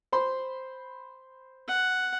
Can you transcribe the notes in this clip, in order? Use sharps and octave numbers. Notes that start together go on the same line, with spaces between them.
C5 B5 C6
F#5